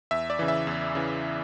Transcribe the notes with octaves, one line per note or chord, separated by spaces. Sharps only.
E2 E5
D5
C#3 E3
E5
E2
C#3 E3